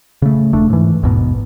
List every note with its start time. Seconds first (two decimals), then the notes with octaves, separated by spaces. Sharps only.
0.22 C#3 A3
0.53 E1 A3 D4
0.70 G#2 E3
1.03 G#1 E2 G#2 B2